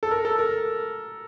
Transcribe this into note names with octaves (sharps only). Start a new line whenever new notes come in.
A4
A#4
A4
A#4